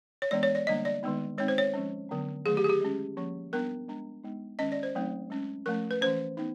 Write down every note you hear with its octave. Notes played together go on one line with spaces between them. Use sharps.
C#5
E3 G#3 B3 D4 D5
C#5
D5
D3 G3 A#3 D4 D#5
D5
D#3 G#3 B3 D#4
G#3 C4 D#4 C#5
C5
C#5
F3 G#3 C#4
D3 F#3 B3 D4
D#3 F#3 A3 G#4
G4
G#4
G4
G#3 C#4
F3 A#3 C#4
G3 B3 D4 A#4
G#3 B3 D4
G#3 B3 D#4
D#3 G#3 C#4 D#5
D5
C5
F#3 A3 C4 D#4
G#3 C#4
F3 A3 C#4 A#4
B4
E3 A3 C#4 C5
B3 D#4